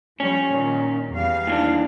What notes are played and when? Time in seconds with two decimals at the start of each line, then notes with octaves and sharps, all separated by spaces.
0.20 F3 G3 C#4 C#5
0.51 A#2 D#3
1.11 E2 G3 F5
1.47 D#2 E3 D4